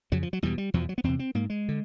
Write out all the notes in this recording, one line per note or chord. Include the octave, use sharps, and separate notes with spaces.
F2 C#3 F#3
F3
F#3
E2 B2 G3
G3
E2 B2 F3
F#3
B3
E2 C3 C4
C4
G#2 A#3
G#3
D3